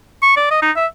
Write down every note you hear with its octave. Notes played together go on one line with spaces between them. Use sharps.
C#6
D5
D#5
D#4
E5